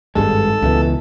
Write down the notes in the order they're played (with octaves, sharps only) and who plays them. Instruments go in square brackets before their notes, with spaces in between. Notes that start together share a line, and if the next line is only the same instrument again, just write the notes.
[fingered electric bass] G#1 G2 G#3 [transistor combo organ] A4
[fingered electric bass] C#2 B2 E3